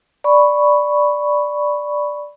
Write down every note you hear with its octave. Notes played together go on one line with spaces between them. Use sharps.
D5 B5 C#6